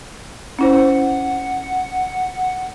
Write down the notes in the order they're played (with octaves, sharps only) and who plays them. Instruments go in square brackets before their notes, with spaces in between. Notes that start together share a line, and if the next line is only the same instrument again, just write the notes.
[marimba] C#4 E4 C5 [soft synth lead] F#5